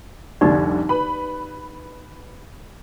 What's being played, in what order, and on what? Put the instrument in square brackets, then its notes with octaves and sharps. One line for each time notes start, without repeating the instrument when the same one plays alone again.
[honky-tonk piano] F1 C2 D3 [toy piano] D#4 G4 D5
[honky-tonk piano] B4 B5